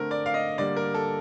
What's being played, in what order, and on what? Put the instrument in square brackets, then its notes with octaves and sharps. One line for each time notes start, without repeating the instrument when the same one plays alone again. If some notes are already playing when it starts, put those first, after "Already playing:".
Already playing: [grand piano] D3 A3 C4 A#4
D5
F5
D#5
D3 G3 A#3 D5
A#4
A4